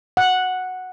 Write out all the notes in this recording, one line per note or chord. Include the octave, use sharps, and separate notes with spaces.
F#5